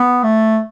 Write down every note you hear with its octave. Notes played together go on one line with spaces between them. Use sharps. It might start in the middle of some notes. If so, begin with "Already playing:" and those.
Already playing: B3
A3